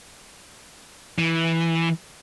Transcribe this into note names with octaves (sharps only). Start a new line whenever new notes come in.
E3